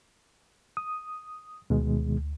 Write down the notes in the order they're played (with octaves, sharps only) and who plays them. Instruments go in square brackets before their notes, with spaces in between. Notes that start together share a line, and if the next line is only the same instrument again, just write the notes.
[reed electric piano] D#6
[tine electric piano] D2 [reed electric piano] B2 D#3 G#3